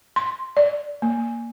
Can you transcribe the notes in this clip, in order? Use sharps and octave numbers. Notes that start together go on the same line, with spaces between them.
C6
D5
A#3